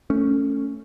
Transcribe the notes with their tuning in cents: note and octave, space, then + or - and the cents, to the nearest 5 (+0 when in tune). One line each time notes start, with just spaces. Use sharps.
A3 +10 C#4 +0